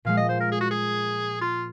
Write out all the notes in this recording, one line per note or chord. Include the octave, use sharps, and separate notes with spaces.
A#2 F3 G#3 F5
D#5
C5
A#4
G#4
F#4
G#4
F4